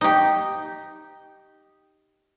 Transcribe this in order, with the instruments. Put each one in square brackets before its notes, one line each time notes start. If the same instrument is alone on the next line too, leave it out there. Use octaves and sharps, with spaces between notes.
[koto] D#4 G4